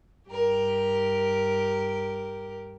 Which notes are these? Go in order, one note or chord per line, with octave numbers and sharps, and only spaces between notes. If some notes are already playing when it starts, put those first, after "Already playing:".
G2 G4 A#4